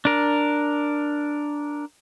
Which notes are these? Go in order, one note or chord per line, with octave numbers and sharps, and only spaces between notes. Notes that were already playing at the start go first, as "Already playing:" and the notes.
D4 A#4